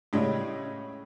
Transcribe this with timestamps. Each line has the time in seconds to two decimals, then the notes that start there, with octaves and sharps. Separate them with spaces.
0.13 A2 C#3 G3 G#3 C#4